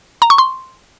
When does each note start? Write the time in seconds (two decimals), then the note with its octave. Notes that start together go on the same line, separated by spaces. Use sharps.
0.22 A#5
0.30 C#6
0.38 C6